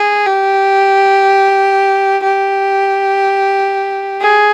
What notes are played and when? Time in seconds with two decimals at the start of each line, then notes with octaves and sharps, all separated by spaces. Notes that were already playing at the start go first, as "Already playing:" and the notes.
Already playing: G#4
0.26 G4
2.23 G4
4.21 G#4